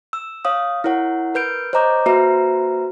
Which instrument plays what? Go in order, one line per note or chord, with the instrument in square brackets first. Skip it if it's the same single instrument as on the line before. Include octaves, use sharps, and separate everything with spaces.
[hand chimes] E6
C#5 F5 D#6
E4 A#4 C#5 F#5
A#4 B4 G6 D7
C5 C#5 D#5 A#5 D6 G6
A#3 F#4 B4 C5 E5 A#5